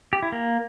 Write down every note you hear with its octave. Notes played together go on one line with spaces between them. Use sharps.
G4
E4
A#3